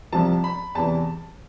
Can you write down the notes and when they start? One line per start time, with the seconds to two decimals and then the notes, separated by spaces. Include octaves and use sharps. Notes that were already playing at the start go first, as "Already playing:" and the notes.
0.13 C2 C3 F3 A5
0.44 B5
0.75 E2 C3 E3 A5